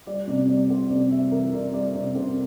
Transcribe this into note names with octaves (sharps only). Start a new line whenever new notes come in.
G3 D5
C3 D5
G3 D5
C3 C5
C3 D5
G3 E5
E3 A#4
C3 D5
G3 D5
C3 D5
C3 C5